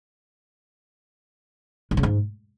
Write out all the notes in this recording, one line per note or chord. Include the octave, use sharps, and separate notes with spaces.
G2
C#3
G#2